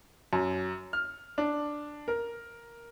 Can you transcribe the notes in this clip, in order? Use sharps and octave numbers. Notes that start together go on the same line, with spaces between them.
F#2
F6
D4
A#4